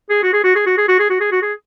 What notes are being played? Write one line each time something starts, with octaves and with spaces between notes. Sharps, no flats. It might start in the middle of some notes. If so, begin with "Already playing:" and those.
G#4
F#4
G#4
F#4
G#4
F#4
G#4
F#4
G#4
F#4
G#4
F#4
G#4